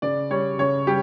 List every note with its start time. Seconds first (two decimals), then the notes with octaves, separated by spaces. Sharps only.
0.02 C#3 D5
0.30 G3 C#5
0.59 C#3 C#5
0.87 G3 G4